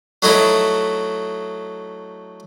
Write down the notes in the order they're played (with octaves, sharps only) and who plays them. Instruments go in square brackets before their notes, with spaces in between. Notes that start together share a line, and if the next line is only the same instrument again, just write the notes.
[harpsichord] F#3 A3 D#4 E4